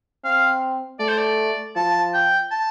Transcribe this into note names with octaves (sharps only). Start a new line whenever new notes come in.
C4 F5
A3 D5
C5
D5
F3 A5
G5
A5